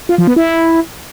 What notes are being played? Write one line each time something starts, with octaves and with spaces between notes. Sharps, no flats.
F4
F3
B3
E4